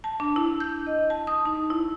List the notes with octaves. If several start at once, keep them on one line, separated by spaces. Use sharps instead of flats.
A5
D4
E4
G6
D#5
A5
D#6
D#4
E4